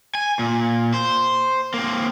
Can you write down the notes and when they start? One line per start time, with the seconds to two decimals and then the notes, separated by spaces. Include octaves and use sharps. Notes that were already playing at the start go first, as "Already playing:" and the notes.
0.15 G#5
0.39 A#2
0.94 C5
1.74 A#3 C4